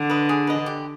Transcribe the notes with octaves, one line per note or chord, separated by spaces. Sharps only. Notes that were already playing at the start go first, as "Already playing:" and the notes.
Already playing: D3
B4 D#5
G#4
B4 D#5
G4